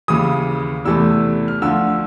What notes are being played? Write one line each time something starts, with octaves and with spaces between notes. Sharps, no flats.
D#2 C#3 E3 D#6
E2 C3 E3 A3 E6
F6
D2 D3 F3 E6